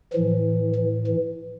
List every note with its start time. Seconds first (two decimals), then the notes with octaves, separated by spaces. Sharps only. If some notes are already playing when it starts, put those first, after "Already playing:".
0.13 A2 E3 F3
0.75 E3
1.07 E3